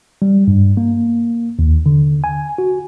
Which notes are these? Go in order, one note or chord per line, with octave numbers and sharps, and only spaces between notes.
G3
G2
A#3
D#2
D3
G#5
F#4